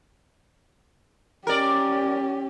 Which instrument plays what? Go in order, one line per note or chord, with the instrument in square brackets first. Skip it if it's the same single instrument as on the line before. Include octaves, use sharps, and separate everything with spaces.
[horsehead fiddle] C#4 G4 [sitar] A#4 D5